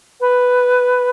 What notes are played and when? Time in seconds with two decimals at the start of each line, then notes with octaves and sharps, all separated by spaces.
0.21 B4